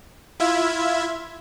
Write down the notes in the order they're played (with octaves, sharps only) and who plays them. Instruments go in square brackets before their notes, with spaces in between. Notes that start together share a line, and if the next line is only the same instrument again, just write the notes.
[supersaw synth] E4 F4 E5 G#6